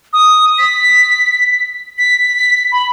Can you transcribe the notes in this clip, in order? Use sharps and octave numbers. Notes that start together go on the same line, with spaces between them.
D#6
B6
B6
B5